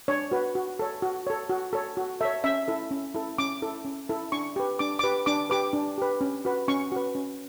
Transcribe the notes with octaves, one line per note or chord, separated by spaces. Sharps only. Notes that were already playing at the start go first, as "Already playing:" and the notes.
D4 C#5
F#4 B4
F#4
A4 C#5
F#4
A4 C#5
F#4
A4 C#5
F#4
A4 C#5 E5
C#4 E5
E4 A4
C#4
E4 A4
C#4 D6
E4 A4
C#4
E4 A4
D4 C#6
G4 B4
D4 D6
G4 B4 D6
D4 D6
G4 B4 D6
D4
G4 B4
C#4
F#4 B4
C#4 C#6
F#4 B4
C#4